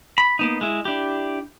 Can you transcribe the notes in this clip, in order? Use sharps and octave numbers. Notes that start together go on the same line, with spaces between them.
B5
A#3 B3 D#4
G#3 E4
D4 E4 G4